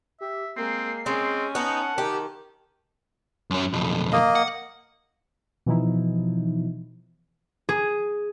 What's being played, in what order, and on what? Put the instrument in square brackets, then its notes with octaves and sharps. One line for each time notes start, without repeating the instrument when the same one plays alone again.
[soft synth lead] G4 [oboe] E5
[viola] G#3 A#3 [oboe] C4 [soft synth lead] C7
[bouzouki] G#3 [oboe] C4 [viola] C#4
[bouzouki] B3 D#4 [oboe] F#5 [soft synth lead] A5
[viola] D#3 [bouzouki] G4
[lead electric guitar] F#2 C#4
B1 F2
[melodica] A#3 D#5
[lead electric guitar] F#5
[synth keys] B2 E3 F3 D#4 E4
[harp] G#4